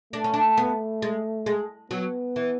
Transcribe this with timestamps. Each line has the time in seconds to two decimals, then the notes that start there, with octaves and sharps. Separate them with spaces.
0.13 A3 D4
0.24 C#4
0.34 D4
0.57 B3
1.02 G#3
1.46 G#3
1.91 F#3 B3
2.36 E3